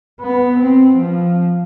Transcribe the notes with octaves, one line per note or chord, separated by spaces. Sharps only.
B3
C4
F3